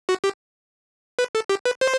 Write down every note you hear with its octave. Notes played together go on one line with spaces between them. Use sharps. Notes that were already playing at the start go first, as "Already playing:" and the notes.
F#4
G4
B4
A4
G4
B4
C5